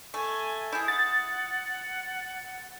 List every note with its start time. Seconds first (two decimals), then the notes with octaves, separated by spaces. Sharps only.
0.14 A3 G#5
0.72 E4 G#4 G6
0.88 F#5 A6